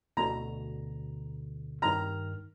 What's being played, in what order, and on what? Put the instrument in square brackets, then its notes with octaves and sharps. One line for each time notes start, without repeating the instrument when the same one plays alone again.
[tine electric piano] D2 B2 D3 [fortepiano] A#5
[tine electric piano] G2 D#3 F6 [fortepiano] A#5